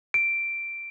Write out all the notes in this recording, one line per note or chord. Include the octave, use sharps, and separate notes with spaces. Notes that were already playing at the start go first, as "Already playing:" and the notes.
D7